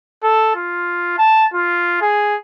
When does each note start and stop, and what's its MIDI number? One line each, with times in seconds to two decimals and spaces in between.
0.23 0.51 69
0.56 1.17 65
1.18 1.46 81
1.54 2.00 65
2.01 2.36 68